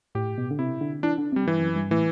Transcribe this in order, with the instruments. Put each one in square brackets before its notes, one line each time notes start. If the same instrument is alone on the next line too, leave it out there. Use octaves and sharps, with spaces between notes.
[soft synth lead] A2 [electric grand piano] G4
[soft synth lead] B2
D3
[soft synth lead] C3 [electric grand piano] E4
[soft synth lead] D3
[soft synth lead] E3 [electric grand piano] D4
[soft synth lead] D3
[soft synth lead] C3 [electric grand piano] G3
[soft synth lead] G2 [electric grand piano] E3
[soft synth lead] F#2
G2
[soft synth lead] A2 [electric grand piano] E3